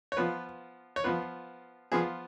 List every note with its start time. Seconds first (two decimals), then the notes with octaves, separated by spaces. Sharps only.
0.12 C#5
0.17 F3 B3 F4 B4
0.96 C#5
1.04 F3 B3 F4 B4
1.92 F3 B3 F4 G#4